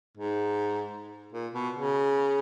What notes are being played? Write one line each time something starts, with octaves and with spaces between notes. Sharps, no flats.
G#2
A#2
B2
C#3